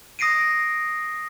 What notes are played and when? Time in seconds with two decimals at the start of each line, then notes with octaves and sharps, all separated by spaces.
0.19 D#6 A#6 C7 D7 D#7